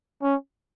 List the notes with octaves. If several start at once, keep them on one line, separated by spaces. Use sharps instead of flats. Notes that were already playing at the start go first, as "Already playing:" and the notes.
C#4